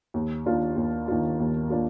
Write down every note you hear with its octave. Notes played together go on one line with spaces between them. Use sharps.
D#2
D#3 A#3 D4 F4
D#2
D#3 A#3 D4 F4
D#2
A#3 D4 F4